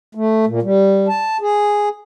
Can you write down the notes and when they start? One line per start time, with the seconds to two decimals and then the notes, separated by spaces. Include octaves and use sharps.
0.15 A3
0.47 A#2
0.62 G3
1.08 A5
1.41 G#4